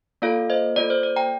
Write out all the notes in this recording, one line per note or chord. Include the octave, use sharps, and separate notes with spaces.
A#3 F4 A4 D5 F5
C5 D#5
A#3 F4 A4 D5
C5
D5
G5 A#5